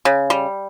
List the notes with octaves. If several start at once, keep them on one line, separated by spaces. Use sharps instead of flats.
C#3
G3